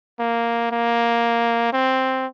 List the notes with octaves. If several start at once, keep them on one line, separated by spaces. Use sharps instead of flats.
A#3
A#3
C4